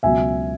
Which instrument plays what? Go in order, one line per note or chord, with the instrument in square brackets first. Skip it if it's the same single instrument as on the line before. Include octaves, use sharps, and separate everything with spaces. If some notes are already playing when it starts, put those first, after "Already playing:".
[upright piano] C#2 B2 F#3 E5 G#5